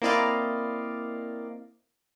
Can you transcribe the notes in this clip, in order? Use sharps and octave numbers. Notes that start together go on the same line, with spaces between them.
A#3 C4 E4 D5 D#5 F5